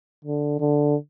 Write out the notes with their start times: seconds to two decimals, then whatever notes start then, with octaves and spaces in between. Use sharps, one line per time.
0.25 D3
0.60 D3